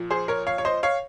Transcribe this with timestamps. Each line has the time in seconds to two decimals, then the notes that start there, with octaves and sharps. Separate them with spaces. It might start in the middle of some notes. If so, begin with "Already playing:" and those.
Already playing: A#2 F3
0.10 G#4 C5
0.28 A#4 C#5
0.47 C#5 F5
0.58 C#5
0.65 C5 D#5
0.83 C#5 F5